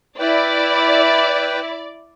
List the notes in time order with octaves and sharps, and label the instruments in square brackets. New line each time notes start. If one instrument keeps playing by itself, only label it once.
[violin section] E4 [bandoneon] B4 G5 [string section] D5